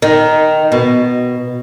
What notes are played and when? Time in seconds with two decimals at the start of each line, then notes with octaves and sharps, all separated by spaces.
0.02 D#3
0.72 B2